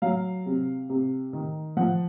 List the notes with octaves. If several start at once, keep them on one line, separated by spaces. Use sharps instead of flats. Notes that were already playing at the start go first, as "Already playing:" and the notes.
F#3 F5
C3
C3
D#3
F3 F#5